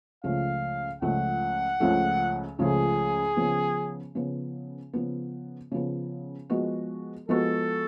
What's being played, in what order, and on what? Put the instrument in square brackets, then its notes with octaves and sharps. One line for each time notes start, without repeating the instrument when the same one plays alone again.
[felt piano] C#2 C#3 F3 A3 [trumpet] F5
[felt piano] C#2 C#3 F3 A3 [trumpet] F#5
[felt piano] C#2 C#3 F3 A3
[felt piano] C#2 C#3 F3 A3 [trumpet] G#4
[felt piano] C#3 F3 B3
C#3 F3 B3
C#3 F3 B3
C#3 F3 B3
F3 G#3 B3 F#4
[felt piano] F3 G#3 B3 F#4 [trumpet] A4